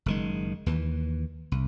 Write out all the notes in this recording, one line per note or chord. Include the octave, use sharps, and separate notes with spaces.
F#1 D#3 G#3
D#2 E3
C2